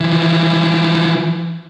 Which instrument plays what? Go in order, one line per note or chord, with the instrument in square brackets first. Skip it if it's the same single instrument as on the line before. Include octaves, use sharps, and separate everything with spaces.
[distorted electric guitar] E3 F3